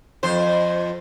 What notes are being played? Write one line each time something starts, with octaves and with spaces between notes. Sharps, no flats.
F2 C5